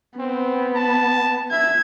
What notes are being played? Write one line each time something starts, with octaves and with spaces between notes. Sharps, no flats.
B3 C4
A5
E5 G#6